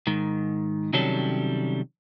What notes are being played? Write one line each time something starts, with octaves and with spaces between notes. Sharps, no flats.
G#2 D#3
C3 D#3 F#3 G3 C#4 A4